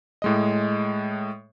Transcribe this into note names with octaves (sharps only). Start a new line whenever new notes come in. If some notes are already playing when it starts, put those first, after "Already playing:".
A2 G#3 D#5